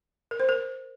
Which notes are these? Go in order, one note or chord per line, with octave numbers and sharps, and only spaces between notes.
A#4
C5
A#4